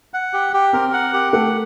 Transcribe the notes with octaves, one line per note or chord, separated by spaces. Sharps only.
F#5
G4
G4
C4 A#4
F#5
G4
A3 F#5